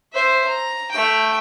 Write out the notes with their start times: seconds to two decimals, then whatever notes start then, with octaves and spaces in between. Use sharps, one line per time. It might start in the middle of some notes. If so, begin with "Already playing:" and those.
0.13 C5 E5
0.47 A#5
0.91 A3 G5